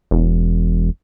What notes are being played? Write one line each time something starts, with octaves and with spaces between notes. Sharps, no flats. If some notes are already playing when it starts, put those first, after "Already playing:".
E1